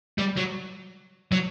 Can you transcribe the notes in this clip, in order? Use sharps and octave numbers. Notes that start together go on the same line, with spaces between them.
G3
F#3
F#3